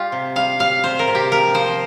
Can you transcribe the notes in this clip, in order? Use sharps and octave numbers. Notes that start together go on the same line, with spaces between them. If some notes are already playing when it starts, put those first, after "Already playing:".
Already playing: G3 F4 G4
C3
G3 F5
G3 F5
C3 C5
A#4
C3
G4
F3 A#4
F3 C5